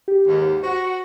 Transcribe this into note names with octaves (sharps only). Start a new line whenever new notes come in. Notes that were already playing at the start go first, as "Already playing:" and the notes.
G4
D#2 G#2
F#4 C5